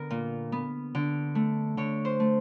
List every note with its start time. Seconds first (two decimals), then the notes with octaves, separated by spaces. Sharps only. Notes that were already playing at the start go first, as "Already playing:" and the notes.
Already playing: D3 B3 A#4
0.10 A#2
0.52 B3
0.95 D3
1.35 A3
1.77 D3 C#5
2.05 C5
2.20 A3